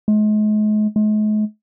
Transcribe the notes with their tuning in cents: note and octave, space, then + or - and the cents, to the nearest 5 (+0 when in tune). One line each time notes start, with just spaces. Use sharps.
G#3 +40
G#3 +45